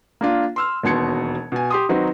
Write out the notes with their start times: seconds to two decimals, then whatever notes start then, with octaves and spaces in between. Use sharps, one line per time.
0.21 A#3 D4 F4
0.56 C6 E6 F6
0.83 E1 D#2 B2 C6 G#6 C#7
1.52 B2 G#5
1.71 G4 C6 D#6
1.89 D#3 F#3 C4 D#4 F#4 B4